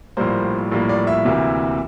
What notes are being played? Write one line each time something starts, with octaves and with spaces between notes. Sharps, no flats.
A#1 A2 G3 A#3 C5
A#1 A2 G3 A#3
D5
E5
D2 C3 E3 A#3